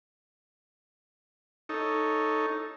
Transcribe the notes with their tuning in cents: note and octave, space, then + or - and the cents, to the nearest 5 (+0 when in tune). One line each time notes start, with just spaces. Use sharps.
D#4 +0 A4 +0 C#5 +0